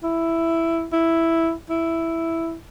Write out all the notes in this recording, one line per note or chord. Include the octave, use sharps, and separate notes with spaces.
E4
E4
E4